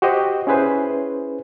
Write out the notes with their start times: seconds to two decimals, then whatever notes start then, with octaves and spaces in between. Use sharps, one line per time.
0.02 F#4 G4 C5 D#5
0.47 C#4 E4 G#4 B4 C5